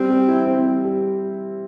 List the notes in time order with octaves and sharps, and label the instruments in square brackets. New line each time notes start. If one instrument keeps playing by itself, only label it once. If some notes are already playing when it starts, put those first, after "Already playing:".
Already playing: [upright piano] G3 [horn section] C4
[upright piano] G3
E4
C4
G3
G3